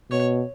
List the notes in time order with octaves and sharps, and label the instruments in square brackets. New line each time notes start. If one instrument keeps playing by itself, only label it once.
[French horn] B2 [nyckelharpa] C#5